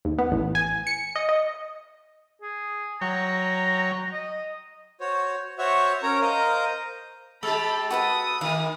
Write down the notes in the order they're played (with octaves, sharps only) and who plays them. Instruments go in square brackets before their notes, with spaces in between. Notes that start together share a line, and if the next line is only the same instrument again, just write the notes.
[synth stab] D#2
B3
A1
G#5
C#7
D#5
D#5
[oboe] G#4
[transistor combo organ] F#3 C#5 G5 [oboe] A#5
[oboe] D#5
[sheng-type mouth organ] F#4 C5 C#5
F#4 C5 C#5 E5 F#5 C#6
C#4 A#4 C#5 A#5
A#4 C5 D#5 F5 A#5
[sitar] G#3 G4 [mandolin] A4 [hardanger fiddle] A5 B5
[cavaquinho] F#4 B4 A5 [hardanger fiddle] D#6
[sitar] D#3 A#3 [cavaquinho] F5